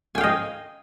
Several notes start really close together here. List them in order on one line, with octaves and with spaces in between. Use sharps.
G#5 G5 F5 D#5